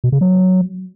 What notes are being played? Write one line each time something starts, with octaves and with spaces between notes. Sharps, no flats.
B2
C#3
F#3